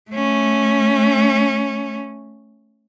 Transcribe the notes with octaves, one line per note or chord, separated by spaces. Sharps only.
A3 C#4